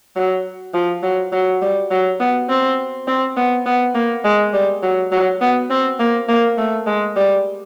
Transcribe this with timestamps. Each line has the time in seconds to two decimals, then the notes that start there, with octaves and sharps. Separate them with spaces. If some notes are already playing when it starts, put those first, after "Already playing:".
0.16 F#3
0.74 F3
1.03 F#3
1.32 F#3
1.62 G3
1.91 F#3
2.20 B3
2.49 C4
3.08 C4
3.37 B3
3.66 B3
3.95 A#3
4.24 G#3
4.53 G3
4.83 F#3
5.12 F#3
5.41 B3
5.70 C4
6.00 A#3
6.29 A#3
6.58 A3
6.87 G#3
7.16 G3